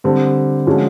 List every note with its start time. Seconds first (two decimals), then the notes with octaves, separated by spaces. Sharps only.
0.04 D3 G3 C4
0.67 D3 F3 G#3 C#4 F#4